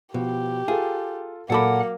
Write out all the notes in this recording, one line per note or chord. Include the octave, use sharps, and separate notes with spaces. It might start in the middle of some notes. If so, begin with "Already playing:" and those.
B2 F3 G4
F4 G#4 A4
A#2 F#3 A#3 A4 F#5 B5 D6